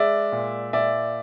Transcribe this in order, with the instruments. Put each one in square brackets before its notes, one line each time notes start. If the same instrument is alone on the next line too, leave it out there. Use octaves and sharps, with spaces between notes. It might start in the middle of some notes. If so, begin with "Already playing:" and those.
Already playing: [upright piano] G#3 D5 E5
A#2
A#2 D5 E5